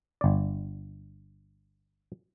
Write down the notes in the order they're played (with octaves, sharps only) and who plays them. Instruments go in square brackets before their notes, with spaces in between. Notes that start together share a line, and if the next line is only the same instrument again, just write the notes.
[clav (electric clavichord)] G1 D5